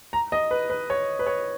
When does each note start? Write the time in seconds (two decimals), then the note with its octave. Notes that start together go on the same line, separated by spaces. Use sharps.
0.13 A#5
0.32 D#5
0.51 B4
0.70 B4
0.90 C#5
1.19 B4
1.27 C#5